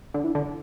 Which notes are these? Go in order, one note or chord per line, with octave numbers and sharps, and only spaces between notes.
D3
E3
D3